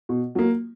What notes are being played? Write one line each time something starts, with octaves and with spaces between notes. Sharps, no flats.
B2
F#3 A#3